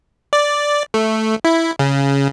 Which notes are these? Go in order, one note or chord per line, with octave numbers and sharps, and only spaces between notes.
D5
A3
E4
C#3